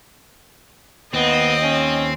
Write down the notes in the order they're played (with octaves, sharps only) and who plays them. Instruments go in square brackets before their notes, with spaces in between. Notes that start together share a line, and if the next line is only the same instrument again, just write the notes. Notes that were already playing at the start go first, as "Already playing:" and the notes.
[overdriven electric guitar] D#2 [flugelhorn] B3 [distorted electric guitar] C4 [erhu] D#5
[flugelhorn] C#4